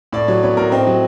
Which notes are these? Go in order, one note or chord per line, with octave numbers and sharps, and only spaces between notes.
A2 D5
F#3 C#5
B3 C#5
A2 A#4
C4 D#5
F#3